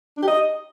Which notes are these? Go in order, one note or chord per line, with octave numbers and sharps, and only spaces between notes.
D4
G4
D#5